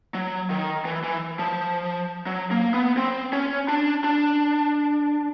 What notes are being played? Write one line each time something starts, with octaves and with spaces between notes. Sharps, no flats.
F#3
D#3
E3
E3
F3
F#3
A#3
B3
C4
C#4
D4
D4